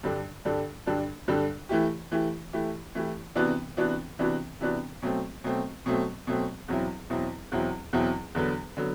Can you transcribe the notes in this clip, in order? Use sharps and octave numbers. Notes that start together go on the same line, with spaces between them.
G2 D3 G3 D4 A4
G2 D3 G3 D4 A4
G2 D3 G3 D4 A4
G2 D3 G3 D4 A4
E3 A3 E4 G4
E3 A3 E4 G4
E3 A3 E4 G4
E3 A3 E4 G4
C3 E3 B3 D4 F#4
C3 E3 B3 D4 F#4
C3 E3 B3 D4 F#4
C3 E3 B3 D4 F#4
B2 F#3 A3 C4
B2 F#3 A3 C4
B2 F#3 A3 C4
B2 F#3 A3 C4
E2 B2 F#3 C4 E4
E2 B2 F#3 C4 E4
E2 B2 F#3 C4 E4
E2 B2 F#3 C4 E4
E2 D3 F#3 B3
D3 F#3 B3